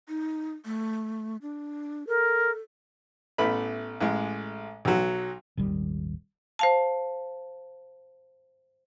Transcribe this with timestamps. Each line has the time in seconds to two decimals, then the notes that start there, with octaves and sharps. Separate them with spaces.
0.08 D#4
0.65 A3
1.42 D4
2.07 A4 A#4
3.38 A1 A3 B3 B5
4.00 A1 G#3
4.85 B1 F#3
5.57 D#1 G#1 D#3 G3
6.59 C5 F5 A5